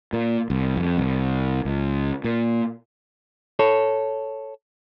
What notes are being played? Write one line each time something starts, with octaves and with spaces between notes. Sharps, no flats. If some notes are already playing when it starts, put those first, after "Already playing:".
A#2
C2
F2
C2
C#2
A#2
A4 C#5